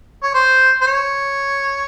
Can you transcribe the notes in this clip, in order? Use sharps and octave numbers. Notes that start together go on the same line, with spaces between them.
C#5
C5
C5
C#5